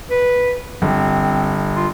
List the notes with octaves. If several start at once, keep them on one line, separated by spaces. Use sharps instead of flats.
B4
G1 C4
F4